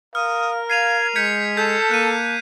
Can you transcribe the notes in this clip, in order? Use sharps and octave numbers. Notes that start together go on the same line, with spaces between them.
A#4 F5 D#6 F6
F5 G#6 C7 D#7 F7
G#3 G6 G#6 B6 C#7
A4 A5 G6 B6
A#3 F#6 D#7